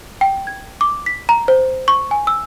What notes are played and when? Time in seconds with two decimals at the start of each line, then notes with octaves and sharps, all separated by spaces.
0.21 G5
0.47 G#6
0.81 D6
1.06 B6
1.29 A#5
1.48 C5
1.88 C#6
2.11 G#5
2.27 E6